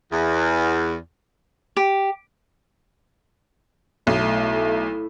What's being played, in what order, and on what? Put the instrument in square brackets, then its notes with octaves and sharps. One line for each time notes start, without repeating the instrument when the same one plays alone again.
[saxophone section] E2
[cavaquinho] G4
[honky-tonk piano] B1 [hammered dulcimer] A2 [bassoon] A3